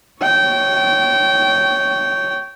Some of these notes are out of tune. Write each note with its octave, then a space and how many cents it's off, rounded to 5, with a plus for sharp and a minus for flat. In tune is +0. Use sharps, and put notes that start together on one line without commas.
C#5 +5 G5 -20